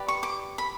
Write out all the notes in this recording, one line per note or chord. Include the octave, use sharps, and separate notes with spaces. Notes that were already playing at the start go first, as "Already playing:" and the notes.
Already playing: G4 B4 D5
C#6
D6
B5